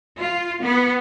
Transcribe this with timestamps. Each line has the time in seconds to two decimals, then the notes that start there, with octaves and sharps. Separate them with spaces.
0.19 F4
0.61 B3